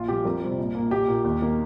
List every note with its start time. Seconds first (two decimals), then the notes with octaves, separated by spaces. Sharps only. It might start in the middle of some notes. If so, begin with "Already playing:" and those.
Already playing: A#1 F4
0.08 A#2 F3 G4
0.25 F2 A#4
0.42 C3 G3 C4
0.58 A#1
0.75 A#2 A#3
0.91 A#1 G4
1.08 A#2 A#3
1.24 D#2
1.41 D#3 A#3